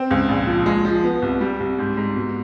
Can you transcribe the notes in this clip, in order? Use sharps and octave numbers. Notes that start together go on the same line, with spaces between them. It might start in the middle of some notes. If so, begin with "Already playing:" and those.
Already playing: C4
C#2
A#1
F3
G#3
F3
B3
C2
G3
C2
G#2
G#2
B2